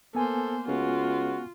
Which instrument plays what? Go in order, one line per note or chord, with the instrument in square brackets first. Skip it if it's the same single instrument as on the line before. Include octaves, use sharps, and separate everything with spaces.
[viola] A#3 C5 [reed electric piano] B3 G#5 [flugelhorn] A4
[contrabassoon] C#2 [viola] F4 [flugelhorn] F#4